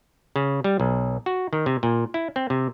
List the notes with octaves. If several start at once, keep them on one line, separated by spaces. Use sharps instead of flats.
C#3
G3
B1
F#4
D#3
C3
A#2
E4
C4
C3